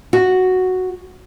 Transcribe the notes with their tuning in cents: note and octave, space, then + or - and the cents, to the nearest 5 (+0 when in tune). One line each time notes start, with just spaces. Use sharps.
F#4 +0